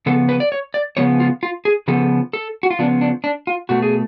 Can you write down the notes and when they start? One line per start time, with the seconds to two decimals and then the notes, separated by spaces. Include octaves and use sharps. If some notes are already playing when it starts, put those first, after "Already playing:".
0.06 C#3 F3 B3 A4
0.29 B4
0.40 D5
0.52 C#5
0.74 D5
0.97 C#3 F3 B3 C#5
1.20 F4
1.43 F4
1.65 G#4
1.88 C#3 F3 B3 A4
2.33 A4
2.63 F#4
2.70 F4
2.79 C#3 F3 B3 D4
3.01 D4
3.24 D4
3.47 F4
3.69 B2 A3 F#4
3.82 G#4